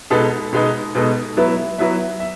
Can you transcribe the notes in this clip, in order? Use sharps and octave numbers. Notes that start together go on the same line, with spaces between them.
B2 G#3 B3 D#4 A4
B2 G#3 B3 D#4 A4
B2 G#3 B3 D#4 A4
F#3 B3 E4 B4 E5
F#3 B3 E4 B4 E5
E5